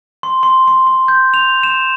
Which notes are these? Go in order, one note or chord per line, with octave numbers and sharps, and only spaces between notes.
C6
C6
C6
C6
G6
F7
E7